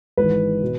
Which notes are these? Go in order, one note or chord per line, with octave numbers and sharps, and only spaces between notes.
G#1 G#2 E3 B4
B2